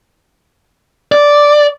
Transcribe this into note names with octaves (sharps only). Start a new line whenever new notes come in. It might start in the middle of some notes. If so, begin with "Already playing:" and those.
D5